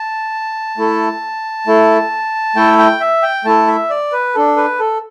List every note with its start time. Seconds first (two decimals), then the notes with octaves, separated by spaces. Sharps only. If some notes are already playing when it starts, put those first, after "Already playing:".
Already playing: A5
0.77 A3 E4 A4
1.67 A3 E4 A4
2.56 A3 E4 A4 G5
2.78 G5
3.00 E5
3.23 G5
3.45 A3 E4 A4 A5
3.67 E5
3.90 D5
4.12 B4
4.35 D4 A4
4.57 B4
4.79 A4